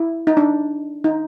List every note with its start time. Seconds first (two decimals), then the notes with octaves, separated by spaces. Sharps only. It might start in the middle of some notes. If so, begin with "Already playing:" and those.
Already playing: E4
0.27 D#4
0.37 D4
1.04 D#4